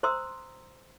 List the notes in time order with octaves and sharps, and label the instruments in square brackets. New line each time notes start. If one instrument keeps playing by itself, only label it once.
[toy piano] C5 A#5 C6 D#6 E6